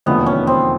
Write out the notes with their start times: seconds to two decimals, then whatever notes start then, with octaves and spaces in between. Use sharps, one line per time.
0.06 E1 D#2 D3 F3 A3 B3
0.26 C#4
0.47 C4